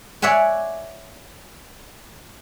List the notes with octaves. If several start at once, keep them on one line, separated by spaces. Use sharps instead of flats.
C#5 D5 E5 F#5 G#5